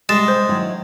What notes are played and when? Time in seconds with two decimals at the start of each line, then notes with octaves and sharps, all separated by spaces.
0.09 C3 G3 G#3 A6 E7
0.28 C5
0.49 D#3 F#3 E4